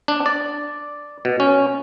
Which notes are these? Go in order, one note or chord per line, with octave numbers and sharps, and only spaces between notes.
D4
D5
B2
C#4